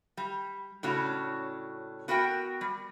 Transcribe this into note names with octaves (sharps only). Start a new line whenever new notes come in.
G3
A2 C#3 C#4 D4 F#4
B3 F#4 A#4 E5 G5
G3